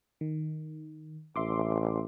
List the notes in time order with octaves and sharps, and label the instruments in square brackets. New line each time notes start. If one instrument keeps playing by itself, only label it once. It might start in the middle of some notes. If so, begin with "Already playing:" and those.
[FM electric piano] D#3
[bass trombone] A1 [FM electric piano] E5 C6 D6